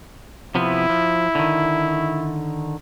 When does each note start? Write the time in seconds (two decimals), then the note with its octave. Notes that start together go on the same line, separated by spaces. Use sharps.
0.55 C3 F3 B3 E4
0.90 F3
1.35 D3 D#3